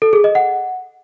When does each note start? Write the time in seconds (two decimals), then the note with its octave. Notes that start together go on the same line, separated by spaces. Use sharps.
0.02 A4
0.13 G#4
0.24 D#5
0.35 F#5